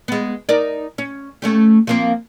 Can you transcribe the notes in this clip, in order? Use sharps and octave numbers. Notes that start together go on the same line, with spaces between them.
G#3 B3
D#4 A#4 D5
C#4
A3 C#4 G4
F3 A#3 C4